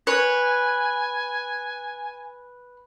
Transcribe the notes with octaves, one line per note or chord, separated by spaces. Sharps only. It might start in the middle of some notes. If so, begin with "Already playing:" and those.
B4 C#5 G#5